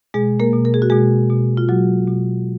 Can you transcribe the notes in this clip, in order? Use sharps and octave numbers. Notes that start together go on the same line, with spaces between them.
B2 G#3 G#4
A#3 A#4
B2
A#4
G#4
F#4
B2 G#3 G#4
B2
F4
B2 F#3 F#4
B2